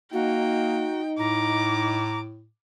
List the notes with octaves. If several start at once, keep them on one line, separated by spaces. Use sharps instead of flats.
A#3 D#4 F#4 G5
A2 A#5 D6